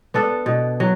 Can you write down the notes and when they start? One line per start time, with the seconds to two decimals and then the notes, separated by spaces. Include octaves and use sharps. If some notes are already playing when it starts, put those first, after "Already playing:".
0.14 B3 D4 A4
0.46 B2
0.80 F#3